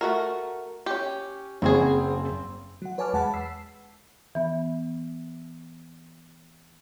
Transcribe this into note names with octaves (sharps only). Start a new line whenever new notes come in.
A3 F#4 A#4
C#4 G4
F#1 C#3 B3 C4 F#4 G#4
F#3 F#5
B4 C#5 G#5 A5 D6 F6
E2 G#3 F#5 A5 B5 A6
E6 B6 C7
E3 B3